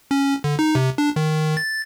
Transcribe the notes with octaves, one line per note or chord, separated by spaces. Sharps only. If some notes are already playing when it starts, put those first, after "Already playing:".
C#4
D3
D#4
C3
D4
D#3
A6